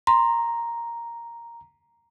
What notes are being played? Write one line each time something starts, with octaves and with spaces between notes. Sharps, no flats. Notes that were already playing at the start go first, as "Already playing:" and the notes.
A#5 C6